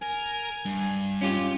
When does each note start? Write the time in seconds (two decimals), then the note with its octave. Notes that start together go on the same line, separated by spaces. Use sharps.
0.02 A#4 G#5
0.65 G2
1.21 C#4 F4 G4